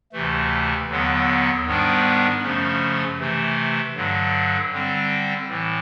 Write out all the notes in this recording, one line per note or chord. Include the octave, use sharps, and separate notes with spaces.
D2 C3 E3 A3
D#2 D3 F#3 B3
G#2 D#3 G3 B3 D4
F#2 C#3 F3 A3 C#4
C3 E3 A3
G2 D3 F#3
D3 G3 C4
A2 E3